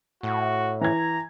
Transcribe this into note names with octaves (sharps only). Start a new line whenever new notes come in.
A2 F#4
E3 A#5 G#6